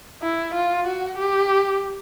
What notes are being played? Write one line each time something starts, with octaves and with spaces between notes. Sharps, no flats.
E4
F4
F#4
G4